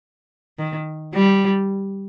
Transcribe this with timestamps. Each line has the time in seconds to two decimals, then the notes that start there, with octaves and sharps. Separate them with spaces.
0.58 D#3
1.14 G3